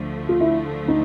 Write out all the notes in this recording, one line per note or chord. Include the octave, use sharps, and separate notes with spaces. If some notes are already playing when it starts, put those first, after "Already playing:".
Already playing: D2 D3 F3 A3
F4
E4
D#4